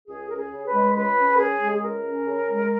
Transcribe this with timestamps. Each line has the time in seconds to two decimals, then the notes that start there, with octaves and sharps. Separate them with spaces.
0.08 C#2 G#4
0.29 C#4 A#4
0.37 G#4
0.51 C#3
0.67 B4
0.74 G#3
0.95 C#2 B4
1.17 C#4
1.34 A#4
1.38 C#3 G#4
1.60 G#3
1.73 G#4
1.82 C#2 A#4
2.04 C#4
2.26 C#3
2.47 G#3